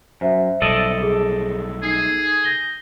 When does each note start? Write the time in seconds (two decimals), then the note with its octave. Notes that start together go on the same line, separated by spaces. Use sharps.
0.21 F#2 C5 E5
0.62 B1 G3 A4 D5 D#5
1.02 G#4
1.83 D#4 G#4 C7
2.44 G6 A#6 G7